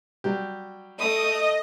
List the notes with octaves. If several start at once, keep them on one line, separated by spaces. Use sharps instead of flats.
F#3 G3 G4
A3 D#5 D#6